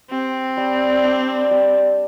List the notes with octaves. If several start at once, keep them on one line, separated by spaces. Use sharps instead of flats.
C4 G4
G3
D4
G3